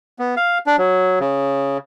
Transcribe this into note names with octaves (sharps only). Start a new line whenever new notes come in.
B3
F5
D4
F#3
C#3